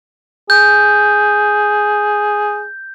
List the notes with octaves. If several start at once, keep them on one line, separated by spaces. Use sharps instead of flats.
G#4 G6